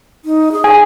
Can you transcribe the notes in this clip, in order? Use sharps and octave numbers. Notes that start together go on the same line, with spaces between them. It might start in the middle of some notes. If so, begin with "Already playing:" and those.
D#4
G#4
G#5